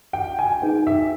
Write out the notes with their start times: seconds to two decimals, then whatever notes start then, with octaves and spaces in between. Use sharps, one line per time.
0.13 G5
0.39 G#5
0.62 D#4 G#4 B4 G5
0.87 E5